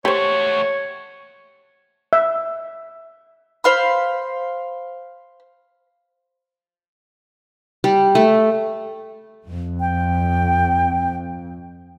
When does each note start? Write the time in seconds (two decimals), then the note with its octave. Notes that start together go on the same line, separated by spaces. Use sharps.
0.05 A3 F#4 G4 C5 C#5
2.13 E5
3.64 C5 F5 B5
7.84 G3
8.15 A3
9.47 F2
9.80 G5